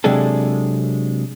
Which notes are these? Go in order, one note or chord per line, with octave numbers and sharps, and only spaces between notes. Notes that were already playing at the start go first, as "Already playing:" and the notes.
C3 F#3 G#3 D4 G#4 A4